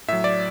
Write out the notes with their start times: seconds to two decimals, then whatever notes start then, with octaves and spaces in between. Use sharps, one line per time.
0.08 A2 F#3 E5
0.24 D5